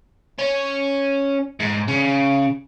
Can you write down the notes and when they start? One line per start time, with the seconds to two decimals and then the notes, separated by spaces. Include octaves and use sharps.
0.39 C#4
1.60 G#2
1.88 C#3